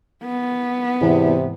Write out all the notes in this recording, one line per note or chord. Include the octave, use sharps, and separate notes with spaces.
B3
E2 G#2 C3 E3